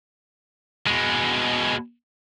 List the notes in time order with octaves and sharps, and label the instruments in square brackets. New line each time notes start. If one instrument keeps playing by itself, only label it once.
[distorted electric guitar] B2 G#3